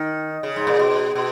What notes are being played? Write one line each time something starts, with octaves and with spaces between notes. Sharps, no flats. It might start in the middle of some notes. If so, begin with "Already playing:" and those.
Already playing: D#3
C#3
G#2
A#2
B2
B2